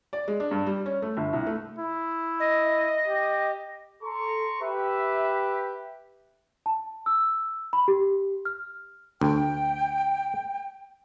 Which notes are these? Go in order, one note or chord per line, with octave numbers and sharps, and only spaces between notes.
D5
G#3
D4
G2
G3
C#4
A3
G1
C2
A3
E4
D#5
G4
A4 A#5 C6 C#6
G4 B4 E5
A5
E6
B5
G4
F6
D2 G5